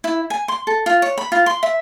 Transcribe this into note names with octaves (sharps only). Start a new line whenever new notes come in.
E4
G#5
C6
A4
F4
C#5
B5
F4
C6
E5